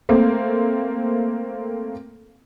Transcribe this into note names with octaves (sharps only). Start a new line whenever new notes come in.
A3 A#3 C4